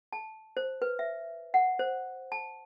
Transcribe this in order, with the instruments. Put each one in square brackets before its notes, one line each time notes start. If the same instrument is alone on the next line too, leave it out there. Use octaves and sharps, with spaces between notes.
[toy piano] A5
C5
B4
E5
F#5
C5
A5